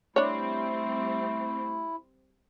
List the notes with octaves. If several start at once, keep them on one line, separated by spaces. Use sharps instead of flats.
G3 A3 C4 D4 E4 C#5